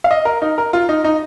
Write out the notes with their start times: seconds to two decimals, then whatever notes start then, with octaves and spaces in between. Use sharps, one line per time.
0.04 F5
0.11 D#5
0.25 A#4
0.42 D#4
0.58 A#4
0.73 F4
0.89 D#4
1.04 D#4